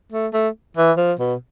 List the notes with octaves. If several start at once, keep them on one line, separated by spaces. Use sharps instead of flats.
A3
A3
E3
F3
B2